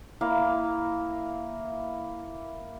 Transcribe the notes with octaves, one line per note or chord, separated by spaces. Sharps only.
A#3 E4 E5 F5